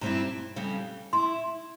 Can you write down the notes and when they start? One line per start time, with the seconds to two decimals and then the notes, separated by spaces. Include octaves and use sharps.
0.01 G2 G3 C4 E4 A#5
0.56 F2 C#3 G3
1.13 E4 C6